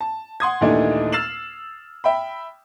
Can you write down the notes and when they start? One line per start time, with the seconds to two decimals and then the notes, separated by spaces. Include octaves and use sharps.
0.01 A5
0.40 F#5 C6 D#6 G#6
0.61 D#2 A#2 E3 A3 D4 D#4
1.12 E6 F6 A6 C7 E7 F#7
2.04 E5 G5 B5